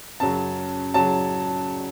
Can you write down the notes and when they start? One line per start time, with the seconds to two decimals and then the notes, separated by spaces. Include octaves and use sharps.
0.20 F#2 C#3 F#3 A5
0.94 C#3 F#3 A5